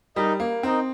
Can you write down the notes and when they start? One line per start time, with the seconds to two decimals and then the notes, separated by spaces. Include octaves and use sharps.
0.16 G3 D#4 A#4 D#5
0.40 A#3
0.63 C4 D#4 A#4 D#5